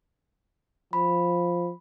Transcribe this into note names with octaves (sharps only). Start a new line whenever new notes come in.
F3 B5